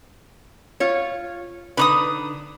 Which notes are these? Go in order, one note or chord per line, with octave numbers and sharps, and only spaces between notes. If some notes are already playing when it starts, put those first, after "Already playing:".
F4 C#5
D3 D#4 B4 B5 C#6 D#6